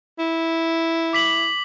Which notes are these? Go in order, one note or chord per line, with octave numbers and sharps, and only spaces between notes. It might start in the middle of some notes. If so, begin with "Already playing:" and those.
E4
D6 B6 F#7